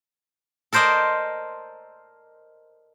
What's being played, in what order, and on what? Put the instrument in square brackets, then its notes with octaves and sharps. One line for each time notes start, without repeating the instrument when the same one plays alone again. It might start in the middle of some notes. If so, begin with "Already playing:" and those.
[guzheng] A4 A#4 C5 D5 D#5 G#5